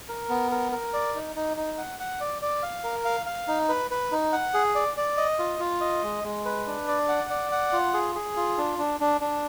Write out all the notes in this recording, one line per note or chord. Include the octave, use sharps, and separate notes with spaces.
A#4
B3
A#4
A#4
D5
D#4
D#4
D#4
F#5
F#5
D5
D5
F5
A#4
F5
F5
D#4
B4
B4
D#4
F#5
G#4
D5
D5
D#5
F4
F4
D#5
G#3
G#3
B4
D4
D5
F#5
D5
F#5
F4
G#4
G#4
F4
D4
D4
D4
D4